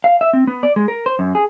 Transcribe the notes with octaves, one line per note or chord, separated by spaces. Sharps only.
F5
E5
C4
B3
D5
G#3
A#4
C5
F#2
G#4